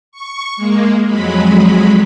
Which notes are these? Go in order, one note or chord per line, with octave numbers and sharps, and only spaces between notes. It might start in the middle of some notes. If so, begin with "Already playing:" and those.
C#6
G#3 A#3
F2 F#3 G#3 B5